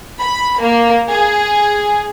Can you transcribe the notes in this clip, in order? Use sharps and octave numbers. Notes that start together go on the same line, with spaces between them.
B5
A#3
G#4